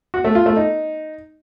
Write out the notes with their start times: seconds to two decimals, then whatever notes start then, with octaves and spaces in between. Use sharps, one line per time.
0.14 F#4
0.24 A3
0.35 F4
0.46 A3
0.57 D#4